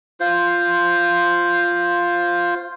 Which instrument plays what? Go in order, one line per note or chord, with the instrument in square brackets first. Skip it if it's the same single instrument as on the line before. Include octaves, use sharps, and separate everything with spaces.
[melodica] F4 C5